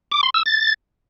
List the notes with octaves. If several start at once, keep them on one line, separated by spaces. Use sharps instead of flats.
D6
C6
E6
A6